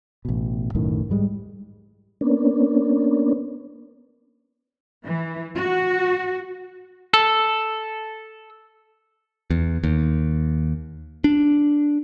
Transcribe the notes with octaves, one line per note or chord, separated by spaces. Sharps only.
A1 B2
B1 F#2 A2 D#3
G#2 G3 G#3
A#3 B3 C#4 D4
E3
F#4
A4
E2
D#2
D4